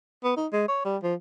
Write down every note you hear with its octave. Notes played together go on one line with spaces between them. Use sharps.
B3
D#4
G#3
C#5
G3
F3